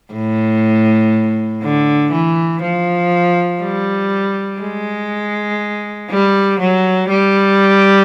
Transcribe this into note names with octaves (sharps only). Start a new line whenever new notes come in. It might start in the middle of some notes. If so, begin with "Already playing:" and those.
A2
D3
E3
F3
G3
G#3
G3
F#3
G3